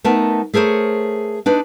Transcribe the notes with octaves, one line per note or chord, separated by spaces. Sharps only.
A3 B3 D#4 A#4 A5
A3 G#4 A#4 C5 C#5
D4 D#4 B4